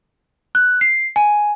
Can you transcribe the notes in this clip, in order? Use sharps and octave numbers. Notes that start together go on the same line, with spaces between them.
F#6
C7
G#5